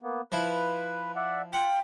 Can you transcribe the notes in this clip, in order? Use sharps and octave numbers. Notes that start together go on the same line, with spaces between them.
A#3 B3
F3 E4 B4
D5 E5 F#5
F4 F#5 G5